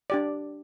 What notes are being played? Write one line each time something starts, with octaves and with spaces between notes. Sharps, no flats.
D4 G4 D5